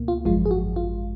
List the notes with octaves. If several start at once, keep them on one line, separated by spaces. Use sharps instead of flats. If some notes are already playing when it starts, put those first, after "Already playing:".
Already playing: C#2 B2 A#3
F4
G#1 F#2 F3 G#3 F4
G#4
F#4
F4